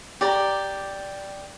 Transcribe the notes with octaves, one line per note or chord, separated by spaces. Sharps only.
G4 D5 A#5